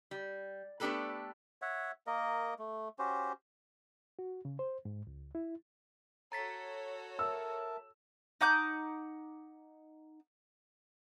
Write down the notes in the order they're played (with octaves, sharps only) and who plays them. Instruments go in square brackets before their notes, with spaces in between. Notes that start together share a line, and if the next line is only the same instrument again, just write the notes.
[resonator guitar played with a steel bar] G3
A3 B3 D4 G4 A4 B4
[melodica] C#5 E5 F#5
A#3 A#4 D#5
A3
C#4 F#4 G4 C5
[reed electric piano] F#4
C#3
C5
G#2
C#2
E4
[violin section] F#4 A4 C#5 [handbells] A#5 A6 B6
[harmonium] A#4 E5 A5 [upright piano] E6
[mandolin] D#4 F#5 D6 G6